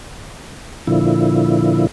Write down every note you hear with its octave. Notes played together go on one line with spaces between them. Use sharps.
A#2 D3 F3 E4